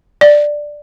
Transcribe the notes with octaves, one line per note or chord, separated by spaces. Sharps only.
D5